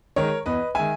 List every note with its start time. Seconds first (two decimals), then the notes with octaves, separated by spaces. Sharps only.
0.16 D#3 G#3 A#4 C#5
0.46 E2 B4 D#5
0.75 D#3 G#3 E5 G#5